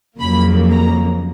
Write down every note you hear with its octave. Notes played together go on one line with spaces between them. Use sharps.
F2 C#3 F#3 A#3 B5
A#5